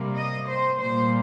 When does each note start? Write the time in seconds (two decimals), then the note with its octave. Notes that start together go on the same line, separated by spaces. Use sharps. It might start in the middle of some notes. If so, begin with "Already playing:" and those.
Already playing: C3 G3 A#3
0.16 D#5
0.47 C5
0.79 A#2 G3 A#3 C5